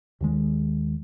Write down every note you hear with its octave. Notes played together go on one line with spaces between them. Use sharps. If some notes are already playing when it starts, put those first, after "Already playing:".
D#2 D#3 G#3